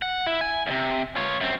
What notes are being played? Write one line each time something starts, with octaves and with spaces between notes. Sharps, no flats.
F#5
E4
G#5
E2 C3
F4 C#5
F#2 C4